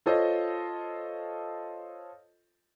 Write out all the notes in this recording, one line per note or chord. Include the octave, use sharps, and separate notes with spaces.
F4 A4 C5 C#5 D#5